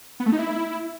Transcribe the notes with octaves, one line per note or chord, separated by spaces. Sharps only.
B3
A3
D#4
E4